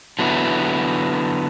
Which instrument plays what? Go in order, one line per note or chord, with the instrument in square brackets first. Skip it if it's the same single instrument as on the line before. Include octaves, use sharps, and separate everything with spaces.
[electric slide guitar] D3 F#3 B3 E4